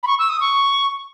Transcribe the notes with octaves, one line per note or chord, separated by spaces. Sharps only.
B5
C#6
E6
D#6
C#6